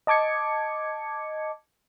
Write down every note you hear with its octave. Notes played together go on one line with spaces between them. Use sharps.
D#5 A5 D6 G#6 C#7